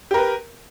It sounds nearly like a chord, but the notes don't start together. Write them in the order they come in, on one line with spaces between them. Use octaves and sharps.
G4 A#4 B4